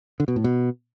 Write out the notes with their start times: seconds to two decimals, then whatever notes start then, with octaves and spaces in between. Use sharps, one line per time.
0.20 D3
0.28 B2
0.36 A2
0.44 B2